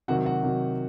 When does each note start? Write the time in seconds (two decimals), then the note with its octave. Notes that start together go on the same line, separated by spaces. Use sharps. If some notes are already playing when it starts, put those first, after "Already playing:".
0.08 C3 D#3 F#3 F#4 F#5
0.26 F#4 F#5
0.43 C3 D#3 F#3